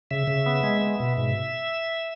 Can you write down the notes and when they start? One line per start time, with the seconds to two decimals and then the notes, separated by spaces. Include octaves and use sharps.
0.11 C#3 E5
0.27 C#3
0.46 B3
0.63 G#3
0.81 B3
1.00 B2
1.17 G#2